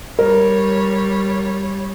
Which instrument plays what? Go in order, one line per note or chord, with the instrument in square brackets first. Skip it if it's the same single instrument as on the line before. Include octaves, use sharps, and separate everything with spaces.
[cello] G3 C#5 [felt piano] A#4